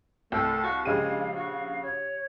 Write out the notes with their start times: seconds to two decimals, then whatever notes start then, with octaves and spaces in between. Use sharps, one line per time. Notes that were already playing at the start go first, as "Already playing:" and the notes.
0.32 C2 A3 G5
0.64 F#4 F5 A6
0.85 A#1 C#3 G#3 G4 D#7
1.34 F#4
1.82 C#5